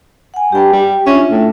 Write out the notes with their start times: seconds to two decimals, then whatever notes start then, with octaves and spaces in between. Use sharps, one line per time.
0.34 F#5 G#5
0.52 G2 G4 G5
0.73 G3
1.07 C#4 D4 F4 E5
1.31 A2